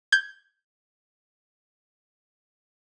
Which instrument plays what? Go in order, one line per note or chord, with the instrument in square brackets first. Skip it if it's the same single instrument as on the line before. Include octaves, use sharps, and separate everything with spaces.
[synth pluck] G6 G#6